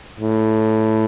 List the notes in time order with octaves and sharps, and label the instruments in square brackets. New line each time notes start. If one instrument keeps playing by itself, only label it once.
[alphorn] A2